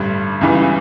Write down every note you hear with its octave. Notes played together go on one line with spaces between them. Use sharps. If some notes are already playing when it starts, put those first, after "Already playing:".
Already playing: A1 G2 D3 G3
C#2 C#3 E3 G3 B3